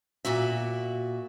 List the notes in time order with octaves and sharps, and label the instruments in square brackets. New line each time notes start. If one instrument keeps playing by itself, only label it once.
[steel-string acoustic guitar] A#2 A#3 F#4 E5